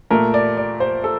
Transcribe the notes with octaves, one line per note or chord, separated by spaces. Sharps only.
A#2 A3 A#4
D5
D5
C5
A4